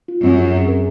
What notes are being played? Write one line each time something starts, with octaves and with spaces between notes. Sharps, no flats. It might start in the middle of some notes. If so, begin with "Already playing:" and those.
F4
F#2 C4
G#4
G#4
A#4